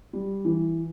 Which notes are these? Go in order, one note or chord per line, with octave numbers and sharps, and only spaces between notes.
G3
E3